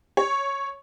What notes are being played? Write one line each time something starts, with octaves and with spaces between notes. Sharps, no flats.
C#5